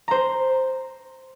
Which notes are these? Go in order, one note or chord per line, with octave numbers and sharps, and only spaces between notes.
C5 A#5